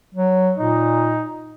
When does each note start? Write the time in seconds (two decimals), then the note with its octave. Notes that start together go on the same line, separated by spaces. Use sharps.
0.14 F#3
0.58 A#2 D#4